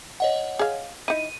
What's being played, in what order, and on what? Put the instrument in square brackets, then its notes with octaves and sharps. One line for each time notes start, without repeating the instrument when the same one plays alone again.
[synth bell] C#5 D#5 F#5
[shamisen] G#4 F5
[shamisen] D#4 E4 [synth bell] D#7